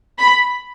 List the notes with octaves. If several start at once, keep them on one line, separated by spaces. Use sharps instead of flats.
B5